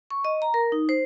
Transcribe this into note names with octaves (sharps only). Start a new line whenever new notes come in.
C#6
D#5
A#5
A#4
D#4
C5